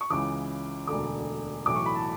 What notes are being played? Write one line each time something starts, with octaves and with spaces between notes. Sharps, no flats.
C#6
C#2 C#3 E3 D6
E1 D2 D3 D6
B1 A2 E3 D6
C#6
B5
A5